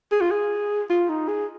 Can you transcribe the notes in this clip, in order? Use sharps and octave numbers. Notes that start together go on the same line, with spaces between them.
G#4
F4
G#4
F4
D#4
G#4